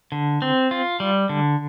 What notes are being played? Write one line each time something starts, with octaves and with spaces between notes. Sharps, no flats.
D3
C4
F4
G3
D3